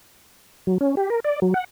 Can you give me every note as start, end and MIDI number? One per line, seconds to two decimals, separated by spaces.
0.67 0.78 54
0.81 0.95 61
0.97 1.10 67
1.10 1.20 70
1.24 1.40 74
1.42 1.54 54
1.54 1.64 78